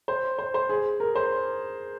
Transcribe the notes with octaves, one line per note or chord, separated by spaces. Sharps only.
C5
C5
C5
G#4
A#4
C5